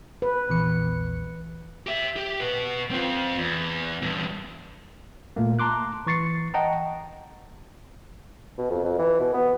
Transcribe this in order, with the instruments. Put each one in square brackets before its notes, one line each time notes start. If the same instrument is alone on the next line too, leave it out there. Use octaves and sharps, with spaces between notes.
[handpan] B4
[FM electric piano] A#1 E2 C#7
[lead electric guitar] G4 E5
G4
B2 B4
C4 F4
E2
E2 G2
[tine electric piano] A#2 A3 A#3
A5 A#5 C6 D6 F#6
E3 C#6 A6 C7 C#7
D#5 F#5 G5 A5 A#5
[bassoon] B2
F2
F2
E3
B2
B3